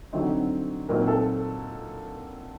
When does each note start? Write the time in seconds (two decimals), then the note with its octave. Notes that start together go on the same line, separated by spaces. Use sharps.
0.13 D3 F#3 C4 D#4
0.89 A#2 F#3 C4 D#4 A#4
1.07 A4